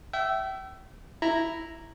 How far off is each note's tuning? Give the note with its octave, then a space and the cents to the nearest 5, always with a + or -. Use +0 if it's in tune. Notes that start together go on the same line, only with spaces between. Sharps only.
E5 +10 G5 -35
E4 +0 A#5 +0